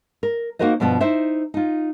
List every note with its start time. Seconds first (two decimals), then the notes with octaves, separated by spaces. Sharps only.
0.23 A#4
0.59 A#3 D#4 F#4 A#4 C5 D#5
0.80 G2 B2 F3 B3
1.01 D#4 E4 C5 E5
1.54 D#4 F4